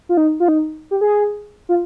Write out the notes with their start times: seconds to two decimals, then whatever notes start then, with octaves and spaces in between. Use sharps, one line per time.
0.09 F4
0.17 D#4
0.40 F4
0.48 D#4
0.91 G4
1.01 G#4
1.69 F4